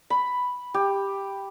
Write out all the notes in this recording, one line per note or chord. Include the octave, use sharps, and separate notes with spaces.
B5
G4